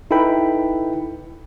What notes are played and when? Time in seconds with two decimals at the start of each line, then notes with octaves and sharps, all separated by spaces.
0.11 D#4 E4 A4 B4 G5 B5